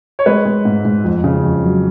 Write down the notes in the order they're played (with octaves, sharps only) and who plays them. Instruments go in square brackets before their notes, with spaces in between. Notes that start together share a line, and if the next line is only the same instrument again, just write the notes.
[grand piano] C#5
G#3 B4
G#3
G#2
G#2
F2
C#3
F2
F#3